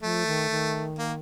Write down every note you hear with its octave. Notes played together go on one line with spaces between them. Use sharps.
F3 A3
D#3
D#3
A#3